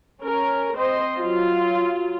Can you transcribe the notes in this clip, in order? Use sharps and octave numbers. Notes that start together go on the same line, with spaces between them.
C#4 A#4
C4 C5 D#5 C6
F#3 F4